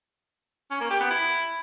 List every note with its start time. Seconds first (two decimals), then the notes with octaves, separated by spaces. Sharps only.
0.70 C#4
0.80 A#3
0.90 G4
1.00 B3
1.10 E4